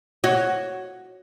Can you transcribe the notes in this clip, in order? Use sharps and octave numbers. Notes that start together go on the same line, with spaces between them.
F#4 C#5